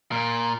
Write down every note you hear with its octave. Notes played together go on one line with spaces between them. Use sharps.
A#2